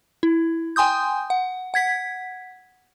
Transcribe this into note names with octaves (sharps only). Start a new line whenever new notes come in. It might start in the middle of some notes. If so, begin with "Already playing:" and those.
E4
G5 G#5 C6 D#6 G6
F#5
F#5 G#6 B6